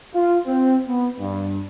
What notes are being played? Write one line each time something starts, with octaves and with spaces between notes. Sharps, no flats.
F4
C4
B3
G2